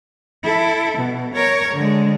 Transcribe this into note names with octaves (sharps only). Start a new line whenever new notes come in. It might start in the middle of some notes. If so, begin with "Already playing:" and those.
E4 A4
B2
A#4 C#5
D3 G#3